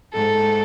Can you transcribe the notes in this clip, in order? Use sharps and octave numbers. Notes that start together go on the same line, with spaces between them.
G#2 A4